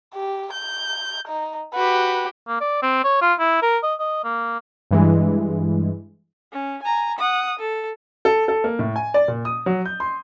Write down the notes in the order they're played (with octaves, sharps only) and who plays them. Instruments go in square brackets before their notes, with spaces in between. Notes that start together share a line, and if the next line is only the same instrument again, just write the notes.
[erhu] G4
G6
D#4
[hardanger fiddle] F#4 G4 [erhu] B4
[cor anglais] A#3
D5
C4
C#5
F4
E4
A#4
D#5
D#5
A#3
[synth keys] G2 E3 G#3
[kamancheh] C#4
G#5 A#5
F#5 D#6
A4
[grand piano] A4
A4
A#3
A2
G#5
D5
A#2
D#6
F#3
G6
C6